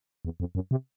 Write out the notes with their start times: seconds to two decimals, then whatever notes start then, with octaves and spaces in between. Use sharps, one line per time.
0.25 E2
0.40 F2
0.55 F#2
0.71 C3